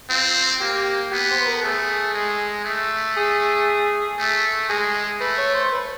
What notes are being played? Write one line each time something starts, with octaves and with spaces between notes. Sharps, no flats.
C4 F4
A#3 G4
B3 G4
C5
B4
A#4
A4
A3 G#4
G#3
A3
G#4
A3
G#3 G#4
A3 B4
C#5
C5
B4